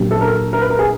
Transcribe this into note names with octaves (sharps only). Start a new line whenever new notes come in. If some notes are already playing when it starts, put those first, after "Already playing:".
Already playing: A#2 F#3 A#3 D4 G4
A4
A#4
A#4
B4
A#4
G#4